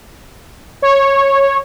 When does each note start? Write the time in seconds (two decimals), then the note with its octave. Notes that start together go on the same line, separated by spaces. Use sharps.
0.82 C#5